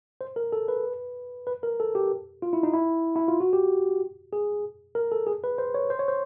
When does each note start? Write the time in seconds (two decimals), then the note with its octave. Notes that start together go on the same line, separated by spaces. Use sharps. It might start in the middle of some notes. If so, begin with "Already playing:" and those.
0.21 C5
0.36 A#4
0.52 A4
0.68 B4
1.47 B4
1.63 A#4
1.80 A4
1.95 G4
2.42 F4
2.53 E4
2.63 D#4
2.73 E4
3.16 E4
3.28 F4
3.40 F#4
3.53 G4
4.33 G#4
4.95 A#4
5.12 A4
5.27 G#4
5.44 B4
5.58 C5
5.74 C#5
5.90 C5
5.99 C#5
6.08 C5